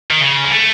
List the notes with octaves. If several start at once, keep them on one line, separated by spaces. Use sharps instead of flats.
D#3
C#3
G#3
A3